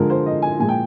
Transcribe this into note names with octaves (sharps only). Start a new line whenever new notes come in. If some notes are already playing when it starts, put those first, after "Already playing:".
Already playing: D3 F3 G#3 A#4
C5
D#5
G#5
A#2 F3 G#3 G#5
G5